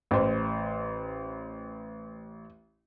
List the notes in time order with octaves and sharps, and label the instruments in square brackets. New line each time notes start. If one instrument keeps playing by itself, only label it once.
[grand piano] A1 C5